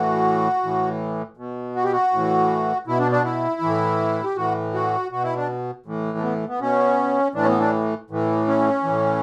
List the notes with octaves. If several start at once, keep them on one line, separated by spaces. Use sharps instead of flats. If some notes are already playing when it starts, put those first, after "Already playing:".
Already playing: A2 E3 F#4
A2 E3
B2
F#4
G4
F#4
A2 E3
B2 E4
D4
D4
E4
A2 E3
G4
A2 E3 F#4
F#4
B2 F#4
E4
D4
A2 E3
A3
B3
B3
B2 C#4
A2 E3 D4
C#4
B3
D4
A2 E3
C#4
A2 E3